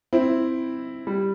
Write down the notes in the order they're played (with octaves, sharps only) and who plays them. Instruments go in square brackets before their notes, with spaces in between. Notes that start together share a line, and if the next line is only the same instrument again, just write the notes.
[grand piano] C4 E4
G3